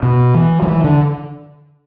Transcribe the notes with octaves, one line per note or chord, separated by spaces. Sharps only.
B2
E3
F#3
E3
D3